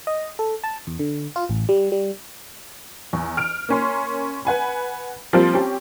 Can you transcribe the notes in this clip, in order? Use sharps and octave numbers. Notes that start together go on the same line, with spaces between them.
D#5
A4
A5
E2
D3
F4
A1
G3
G3
E2
F6 D7
A#3 C#4 C6
B4 F#5 G#5 B5
F3 G3 A#3 C4 F4
C4 C#4 G4